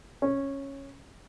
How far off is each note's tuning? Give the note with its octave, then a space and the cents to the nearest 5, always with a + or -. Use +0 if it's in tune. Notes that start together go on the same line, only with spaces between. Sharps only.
C#4 -10